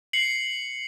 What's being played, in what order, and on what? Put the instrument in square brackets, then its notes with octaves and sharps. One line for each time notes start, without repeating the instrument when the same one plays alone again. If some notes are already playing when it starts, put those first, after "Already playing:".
[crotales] C7 C#7 F#7